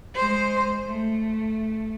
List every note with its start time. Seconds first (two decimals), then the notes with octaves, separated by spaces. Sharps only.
0.15 G#3 C5
0.84 A3